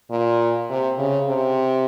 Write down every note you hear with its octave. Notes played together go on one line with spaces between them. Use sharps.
A#2
C3
C#3
C3